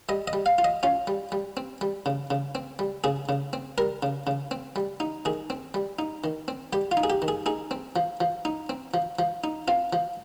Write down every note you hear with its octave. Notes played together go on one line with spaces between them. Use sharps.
G3 D#5
D#5
G3
F5
F4
D#5
C#4 F4
G3
G3
C4
G3
C#3
C#3
C4
G3
C#3 G#4
C#3
C4
G3 A#4
C#3
C#3
C4
G3
D#4
D#3 G#4
C4
G3
D#4
D#3
C4
G3 G4
F4
D#4
G#4
G4
D#3
G#4
D#4 G#4
C4
F3
F3
D#4
C4
F3
F3
D#4
C4 F4
F3